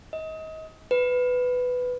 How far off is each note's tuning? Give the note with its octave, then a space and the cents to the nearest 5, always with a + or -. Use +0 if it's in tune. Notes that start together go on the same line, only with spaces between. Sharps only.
D#5 +30
B4 +10